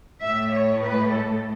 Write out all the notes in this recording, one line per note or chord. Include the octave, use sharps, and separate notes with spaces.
A2 A3 E5
C#5
B4
A4